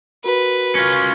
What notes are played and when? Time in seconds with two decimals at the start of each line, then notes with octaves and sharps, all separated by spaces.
0.24 F#4 A#4 B4
0.75 C#4 F4